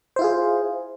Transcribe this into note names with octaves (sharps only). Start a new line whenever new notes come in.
E4 F4 G#4 C5